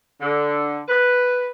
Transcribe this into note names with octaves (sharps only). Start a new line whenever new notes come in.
D3
B4